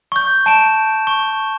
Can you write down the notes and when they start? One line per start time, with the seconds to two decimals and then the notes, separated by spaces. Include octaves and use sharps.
0.12 C#6 G6
0.46 A5 D7 E7
1.07 C#6